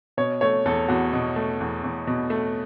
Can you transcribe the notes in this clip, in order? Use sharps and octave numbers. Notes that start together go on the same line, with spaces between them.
B2 C#5
A3 C#5
E2 A4
E2 F#4
B2
A3
E2
E2
B2
A3